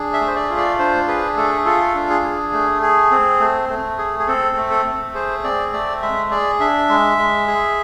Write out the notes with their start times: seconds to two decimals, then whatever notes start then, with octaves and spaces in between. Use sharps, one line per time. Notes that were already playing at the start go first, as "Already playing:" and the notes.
Already playing: D4 G#4
0.13 E5
0.21 A3
0.27 C5
0.36 D5
0.50 F4
0.57 D5
0.79 D4 C5
1.08 G#4 B4
1.37 A3 A4
1.65 F4 A4
1.95 D4
2.10 G#4
2.24 G#4
2.53 A3
2.82 G#4
3.11 C4
3.40 A3
3.69 A3
3.98 G#4
4.19 G#4
4.28 C4 A4
4.56 A3
4.71 A4
4.86 A3
5.15 G#4 C5
5.44 C4 D5
5.73 A3 D5
6.02 G#3 E5
6.31 G#4 D5
6.60 D4 E5
6.89 G#3
7.18 G#3
7.48 G#4